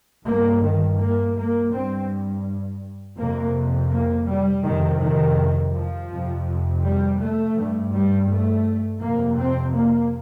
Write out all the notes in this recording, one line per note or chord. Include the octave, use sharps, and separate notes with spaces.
G2 A#3
D#3
A#3
A#3
G2 C4
F2 C3 A#3
A#3
G3
F2 C3 D#3
D#3
F3
F2 C3
G3
A3
G2
G3
A3
F2 C3 A#3
C4
A#3